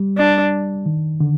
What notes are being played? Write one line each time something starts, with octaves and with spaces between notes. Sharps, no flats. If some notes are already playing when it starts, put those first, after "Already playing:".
Already playing: G3
D4
D#3
D3